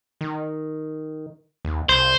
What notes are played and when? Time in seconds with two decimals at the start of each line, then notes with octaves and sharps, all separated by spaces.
0.21 D#3
1.65 D#2
1.89 C2 C5